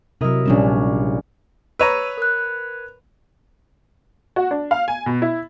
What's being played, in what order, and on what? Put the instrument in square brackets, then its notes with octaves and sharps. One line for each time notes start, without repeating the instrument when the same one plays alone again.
[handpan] C3 F#3 [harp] E4 A#4 D#5
[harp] A#1 E7 [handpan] G3 C#4 D4
[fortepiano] B4 C#5 A#5 [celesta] E6 D#7
[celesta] A#4 F#6
[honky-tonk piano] F#4
D4
F5
G#5
B2
E4